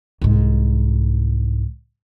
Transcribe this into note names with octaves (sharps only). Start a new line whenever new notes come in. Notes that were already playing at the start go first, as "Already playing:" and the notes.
C2 G#2